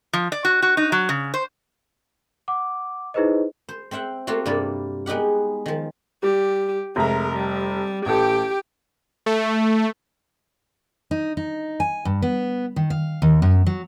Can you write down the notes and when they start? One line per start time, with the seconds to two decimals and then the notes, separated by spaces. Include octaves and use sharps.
0.13 F3
0.32 D5
0.45 F#4
0.62 F#4
0.77 D#4
0.92 F#3
1.09 C#3
1.34 C5
2.48 F#5 D6
3.14 D#4 E4 G#4 B4 C5 D#5
3.69 C5
3.91 C4 C5 E5 F#5 G5
4.27 A3 A#3 C4 F4 F#4
4.46 G2 C3 A#3 A4 D5 B5
5.06 G#3 B3 D#4 G4 F#5
5.66 D#3 F3
6.23 G3 G4
6.96 F1 G#3 A#4 E5 A#5
7.32 G3
8.06 A1 G4 A4 G5
9.26 A3
11.11 D#4
11.37 D#4
11.80 G#5
12.05 G2
12.22 B3
12.76 D#3
12.90 F5
13.22 D#2
13.42 F#2
13.67 F#3